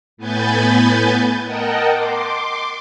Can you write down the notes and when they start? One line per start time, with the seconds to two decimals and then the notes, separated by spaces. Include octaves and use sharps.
0.17 A2 B3 B4 G#5 G6 A6
1.45 A#4 D#5 F#5 G5 A5
1.93 C6 D6